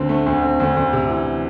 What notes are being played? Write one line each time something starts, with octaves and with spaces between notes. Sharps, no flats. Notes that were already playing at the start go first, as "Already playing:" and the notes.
Already playing: D2 D3 C4
A3
D2
C4
D2
D2
C3
E3